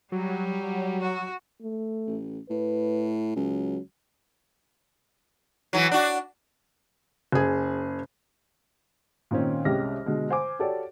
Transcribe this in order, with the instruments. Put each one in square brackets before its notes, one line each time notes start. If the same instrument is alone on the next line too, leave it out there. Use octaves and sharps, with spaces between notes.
[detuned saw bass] F#3 [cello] G3
[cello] F#4
[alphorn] A3
[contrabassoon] A1
[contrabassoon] A2 [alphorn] B4
[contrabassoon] C#2 [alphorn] F#3
[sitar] E3 F#3
D4 F#4
[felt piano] F#1 G#4
[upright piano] A#2 D#3 C4 C#4
C2 G#3 C#4 G4 F6 A#6
B2 D3 G#3
C5 G#5 D6
F#4 G4 A4 C#5 D5